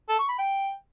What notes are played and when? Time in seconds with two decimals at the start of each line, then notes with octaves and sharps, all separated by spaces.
0.09 A4
0.19 C#6
0.29 B5
0.39 G5